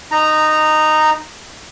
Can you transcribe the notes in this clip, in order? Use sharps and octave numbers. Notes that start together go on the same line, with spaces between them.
D#4 A#5